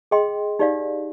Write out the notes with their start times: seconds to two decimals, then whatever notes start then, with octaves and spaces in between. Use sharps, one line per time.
0.11 G#4 D#5 G5 C6
0.59 D#4 G4 D5 F5